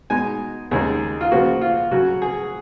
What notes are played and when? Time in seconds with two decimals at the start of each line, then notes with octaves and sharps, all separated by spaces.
0.10 B2 G#3 D#4 G#5
0.71 D#2 C#3 G#3 D#4 G#4
1.21 F4
1.31 C#3 F3 A#3 F#4
1.61 F4
1.91 C#3 F#3 C#4 F#4
2.22 G#4